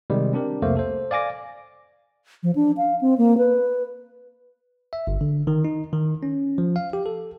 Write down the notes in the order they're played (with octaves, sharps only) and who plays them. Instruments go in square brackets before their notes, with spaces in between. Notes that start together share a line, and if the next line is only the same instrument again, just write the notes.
[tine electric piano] C3 D#3 G3 G#3
C4 D4 G4 A#4
C2 F2 C3 A3 A#3 C5
A4 C5
D5 F5 G#5 D6 A#6
[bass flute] F3
D4
F5
C4
A#3
B4
[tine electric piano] E5
G1
D3
D#3
D#4
D#3
C#4
F3
F5
G4
A4